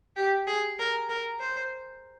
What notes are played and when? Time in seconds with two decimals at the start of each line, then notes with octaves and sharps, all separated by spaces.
0.16 G4
0.47 G#4
0.79 A#4
1.09 A#4
1.40 C5